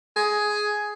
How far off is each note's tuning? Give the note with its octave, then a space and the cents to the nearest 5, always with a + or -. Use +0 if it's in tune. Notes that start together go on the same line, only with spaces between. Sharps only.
G#4 +10